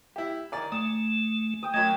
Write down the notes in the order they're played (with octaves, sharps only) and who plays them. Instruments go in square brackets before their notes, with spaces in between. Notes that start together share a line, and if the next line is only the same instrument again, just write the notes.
[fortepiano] E4 G4
[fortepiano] D#3 D5 [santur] G#5 D6
[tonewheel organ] A3 [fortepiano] D#6
[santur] G5 D#6
[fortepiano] F#2 F#3 D#5 [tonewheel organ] A3 [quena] G#6